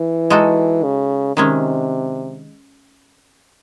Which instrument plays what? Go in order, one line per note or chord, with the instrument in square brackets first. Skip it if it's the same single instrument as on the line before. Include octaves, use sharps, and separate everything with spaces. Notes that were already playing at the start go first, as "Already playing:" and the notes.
Already playing: [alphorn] E3
[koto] G#3 D#4 F#4 A4
[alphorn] C#3
[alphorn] C3 [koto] D#3 G#3 C#4